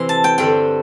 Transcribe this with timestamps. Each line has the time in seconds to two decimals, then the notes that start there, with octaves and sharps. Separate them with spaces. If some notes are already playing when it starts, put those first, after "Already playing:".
Already playing: C3 E3 C6
0.09 A5
0.24 G5
0.38 G2 D3 G3 C4 G5